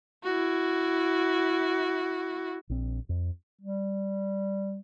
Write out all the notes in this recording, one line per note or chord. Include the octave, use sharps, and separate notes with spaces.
E4 F#4
A#1 C4
F2
G3